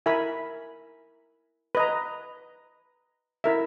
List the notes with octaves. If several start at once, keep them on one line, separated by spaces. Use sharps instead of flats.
E4 A#4 E5 G#5 B5
B4 D#5 A#5
E4 A#4 E5